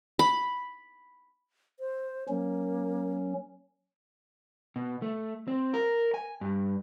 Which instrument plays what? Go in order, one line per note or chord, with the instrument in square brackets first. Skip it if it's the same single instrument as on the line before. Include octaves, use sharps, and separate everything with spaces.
[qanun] B5
[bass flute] C5
[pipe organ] F#3 C#4 [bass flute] A#3
[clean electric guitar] B2
A3
C4
A#4
G#5
G2